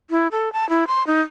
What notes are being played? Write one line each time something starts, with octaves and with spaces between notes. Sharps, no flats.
E4
A4
A5
E4
C6
D#4